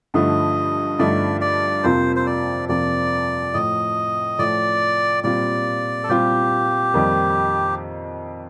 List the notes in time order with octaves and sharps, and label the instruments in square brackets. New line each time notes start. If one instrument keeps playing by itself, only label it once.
[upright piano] G2 D3 F3 A3 D#4 [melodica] D#5
[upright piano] G2 D3 F3 A3 D#4 [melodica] D5
[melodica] D5
[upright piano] F2 C3 F3 A#3 F4 [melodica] C5
[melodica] C5
D5
[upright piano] F2 C3 F3 A#3 F4 [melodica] D5
[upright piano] A2 F3 A3 [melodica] D#5
[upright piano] A2 F3 A3 [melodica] D5
[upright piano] A#2 G3 C4 F4 [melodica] D5
[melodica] A4
[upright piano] A#2 G3 C4 F4 [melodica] G4
[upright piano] F2 D#3 G3 A#3 D#4